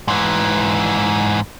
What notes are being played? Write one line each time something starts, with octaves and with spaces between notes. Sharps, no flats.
G#2 E3